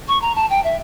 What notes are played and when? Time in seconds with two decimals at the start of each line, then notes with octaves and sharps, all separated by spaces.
0.08 C#6
0.22 A#5
0.35 A5
0.50 G5
0.64 E5